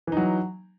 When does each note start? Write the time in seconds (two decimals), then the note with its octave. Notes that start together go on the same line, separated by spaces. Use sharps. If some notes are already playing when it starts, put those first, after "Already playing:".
0.07 E3
0.12 D#4
0.17 F#3